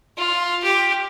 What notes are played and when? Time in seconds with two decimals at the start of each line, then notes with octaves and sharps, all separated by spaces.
0.17 F4
0.63 G4